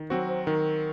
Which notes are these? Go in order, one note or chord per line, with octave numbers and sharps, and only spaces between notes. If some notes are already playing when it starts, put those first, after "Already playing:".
Already playing: D#3
F#3 C4 F#4 C5
C5
D#3 A#4